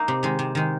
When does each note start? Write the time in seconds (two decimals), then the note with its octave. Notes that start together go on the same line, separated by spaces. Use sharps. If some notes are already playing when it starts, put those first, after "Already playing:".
Already playing: A#3 D#4
0.08 C3
0.23 D#3 G#3
0.39 C3
0.55 D#3 G#3